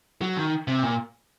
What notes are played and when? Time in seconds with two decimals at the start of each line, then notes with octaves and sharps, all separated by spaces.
0.21 F#3
0.37 D#3
0.68 C3
0.83 A#2